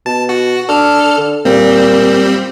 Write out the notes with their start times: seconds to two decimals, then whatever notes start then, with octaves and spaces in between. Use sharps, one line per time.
0.06 B2 A5
0.29 F#4
0.69 D4 A4 F6
1.18 D3
1.45 A#2 G3 C4